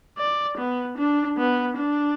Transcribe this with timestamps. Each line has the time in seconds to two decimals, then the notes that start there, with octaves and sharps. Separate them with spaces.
0.18 D5
0.58 B3
0.97 D4
1.38 B3
1.77 D4